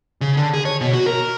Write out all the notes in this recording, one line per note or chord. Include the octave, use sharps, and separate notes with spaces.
C#3
D3
G#4
C#5
B2
F#4
A#4